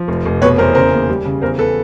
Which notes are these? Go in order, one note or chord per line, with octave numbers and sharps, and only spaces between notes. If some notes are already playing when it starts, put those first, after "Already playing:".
Already playing: F3
F1
F1
B2 B4 C#5
E2 A#4 C5
C#3 A#4 C5
D#2
G3
C#3
E2 A#4 C5
E2 A4 B4